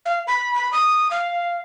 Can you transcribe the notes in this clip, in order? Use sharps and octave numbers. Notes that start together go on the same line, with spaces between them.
F5
B5
B5
D#6
F5